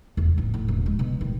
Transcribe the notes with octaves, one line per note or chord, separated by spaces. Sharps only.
E2
A1
A2
D#1
G#3
B2
D#3